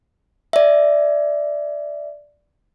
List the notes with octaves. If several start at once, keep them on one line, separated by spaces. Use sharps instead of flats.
D5 E5